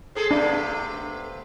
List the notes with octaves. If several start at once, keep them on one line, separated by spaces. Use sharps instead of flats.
C4 G#4 A4
C3 A3 B3 D4